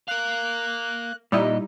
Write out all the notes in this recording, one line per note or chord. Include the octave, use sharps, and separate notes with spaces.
A#4 F5 F#6
A#2 G3 D#4 E4 D#5